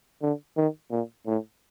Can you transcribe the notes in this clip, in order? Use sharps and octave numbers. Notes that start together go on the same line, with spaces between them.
D3
D#3
A#2
A2